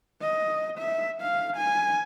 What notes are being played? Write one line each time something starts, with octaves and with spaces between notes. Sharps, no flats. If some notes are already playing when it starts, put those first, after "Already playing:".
D#5
E5
F5
G#5